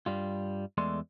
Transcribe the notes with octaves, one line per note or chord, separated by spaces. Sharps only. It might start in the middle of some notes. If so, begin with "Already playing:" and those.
G2 G3 F4
E2 G#3 A3 D5 C6